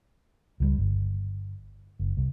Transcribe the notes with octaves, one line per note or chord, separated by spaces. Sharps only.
C#2 F3 G3
G1
F#1
C2